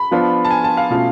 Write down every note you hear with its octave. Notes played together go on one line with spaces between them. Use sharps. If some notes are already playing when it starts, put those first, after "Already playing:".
Already playing: B5
F3 B3 D4 F4
A5
G#5
A5
F5
B2 A3 C#4 F4